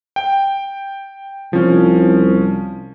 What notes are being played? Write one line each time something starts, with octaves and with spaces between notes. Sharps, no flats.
G5
C2 F3 C#4